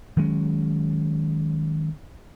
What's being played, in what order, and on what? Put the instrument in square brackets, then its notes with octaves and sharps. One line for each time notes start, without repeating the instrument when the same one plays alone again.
[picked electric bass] D#3 F#3 G#3 C#4